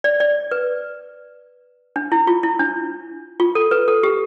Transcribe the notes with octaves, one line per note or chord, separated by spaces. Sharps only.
D5
D5
B4
D4
E4
F4
E4
D4
F4
A4
B4
A4
G4